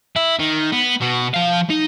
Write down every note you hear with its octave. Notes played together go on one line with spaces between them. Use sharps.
E4
D#3
B3
B2 B3
F3 F5
D#4